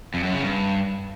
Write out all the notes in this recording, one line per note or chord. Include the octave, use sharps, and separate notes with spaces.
F2
F#2
C#3
G2